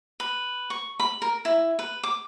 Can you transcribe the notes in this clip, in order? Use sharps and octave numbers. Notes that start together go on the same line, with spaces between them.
B4
C#6
B5
A#4
E4
B4
D6